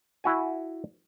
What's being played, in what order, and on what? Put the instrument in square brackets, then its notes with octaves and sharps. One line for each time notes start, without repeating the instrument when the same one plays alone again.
[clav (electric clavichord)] E4 F#4 G#5